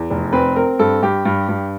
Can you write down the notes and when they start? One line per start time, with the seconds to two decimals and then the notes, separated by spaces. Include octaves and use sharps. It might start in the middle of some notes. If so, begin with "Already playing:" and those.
Already playing: E2
0.10 F1
0.33 C4 B4
0.56 C4 A#4
0.79 G2 A4
1.02 G2 G4
1.25 G2
1.49 G2